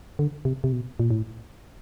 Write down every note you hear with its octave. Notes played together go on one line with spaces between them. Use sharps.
D3
C3
C3
B2
A#2
A2